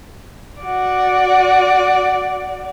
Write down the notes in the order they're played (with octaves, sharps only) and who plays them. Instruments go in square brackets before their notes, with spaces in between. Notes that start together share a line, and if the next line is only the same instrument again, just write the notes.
[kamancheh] F#4 D5